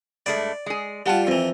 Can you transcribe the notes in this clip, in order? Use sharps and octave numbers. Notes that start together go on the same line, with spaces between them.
G2 G#3 A3 D5
G#3 G#4
G3 F4 D5 F#5 A5
F2 E3 C4